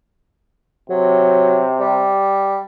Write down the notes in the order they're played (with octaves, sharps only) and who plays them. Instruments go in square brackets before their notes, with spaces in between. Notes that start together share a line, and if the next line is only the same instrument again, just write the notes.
[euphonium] C3 [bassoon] F#3
[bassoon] G3